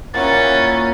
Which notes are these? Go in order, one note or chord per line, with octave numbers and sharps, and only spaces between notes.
A#2 A#3 C#4 E4 F#5 G#5 A6